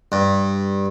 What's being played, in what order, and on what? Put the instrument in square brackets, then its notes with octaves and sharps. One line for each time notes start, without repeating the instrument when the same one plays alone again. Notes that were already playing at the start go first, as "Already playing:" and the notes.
[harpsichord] G2